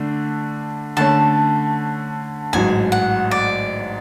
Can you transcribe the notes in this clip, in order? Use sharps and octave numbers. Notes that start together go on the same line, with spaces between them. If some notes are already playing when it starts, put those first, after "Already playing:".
Already playing: D3 A3 D4
D3 A3 C#4 A5
A1 G#2 F#3 G#5
F#5
D5